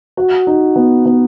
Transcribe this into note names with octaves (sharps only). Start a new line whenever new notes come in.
F#4
D#4
B3
B3